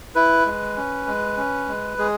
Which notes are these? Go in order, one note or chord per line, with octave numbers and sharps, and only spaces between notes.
E4 B4
G#3
C#4
G#3
C#4
G#3
G#3 G#4